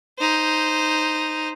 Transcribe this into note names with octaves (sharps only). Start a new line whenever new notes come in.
D#4 C5